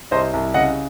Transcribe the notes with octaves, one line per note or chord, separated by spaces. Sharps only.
C2 C5 D#5
C2
C#3 D#5 F#5